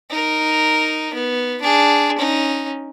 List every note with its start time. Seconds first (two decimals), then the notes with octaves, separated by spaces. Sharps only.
0.10 D#4 A#4
1.14 B3
1.62 D4 G#4
2.18 C#4 D#4